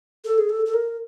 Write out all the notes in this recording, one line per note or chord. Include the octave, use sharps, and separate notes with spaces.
A4
G#4
A4
A4
A#4